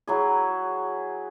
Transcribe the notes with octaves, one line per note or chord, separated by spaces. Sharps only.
F#3 E4 G#4